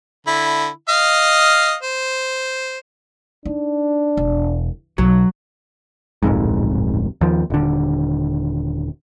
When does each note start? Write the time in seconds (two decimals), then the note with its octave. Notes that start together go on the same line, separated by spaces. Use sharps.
0.27 D3 E4
0.89 D#5 F5
1.83 C5
3.45 D4 D#4
4.17 E1
4.98 B1 F#3
6.23 D1 A#1 F2 G#2
7.21 D#2 F3
7.50 D#1 D3